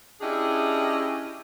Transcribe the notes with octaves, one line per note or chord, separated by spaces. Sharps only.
C#4 D4 E4 G4 G#4 D#5